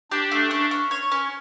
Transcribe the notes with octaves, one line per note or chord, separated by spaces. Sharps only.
D4 G4
A3
C#4
C#4
C#5
C#4